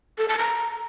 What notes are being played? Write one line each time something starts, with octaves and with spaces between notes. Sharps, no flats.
A4
A5
A#5